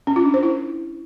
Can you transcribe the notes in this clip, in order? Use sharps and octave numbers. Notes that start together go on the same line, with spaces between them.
C#4
F4
D4
C5
E4